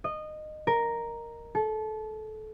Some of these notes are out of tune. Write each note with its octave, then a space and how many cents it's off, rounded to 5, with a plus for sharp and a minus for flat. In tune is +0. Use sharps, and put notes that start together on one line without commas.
D#5 -20
A#4 +0
A4 -25